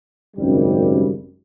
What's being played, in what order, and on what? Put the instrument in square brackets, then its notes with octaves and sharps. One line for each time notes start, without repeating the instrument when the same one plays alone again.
[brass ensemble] G#1 C#2 F#2 G3